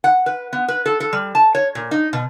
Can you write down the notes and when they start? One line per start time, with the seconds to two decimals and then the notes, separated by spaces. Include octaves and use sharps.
0.04 F#5
0.26 B4
0.53 B3
0.68 B4
0.86 A4
1.00 A4
1.13 G3
1.35 A5
1.55 C#5
1.75 A#2
1.91 D#4
2.13 B2